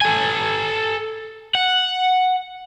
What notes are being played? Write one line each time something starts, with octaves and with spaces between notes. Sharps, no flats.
A4 G#5
F#5